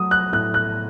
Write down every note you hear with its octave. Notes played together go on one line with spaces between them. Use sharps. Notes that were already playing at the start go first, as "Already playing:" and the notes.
Already playing: F#3 A3 D#6
F#6
A2 F#6
F#6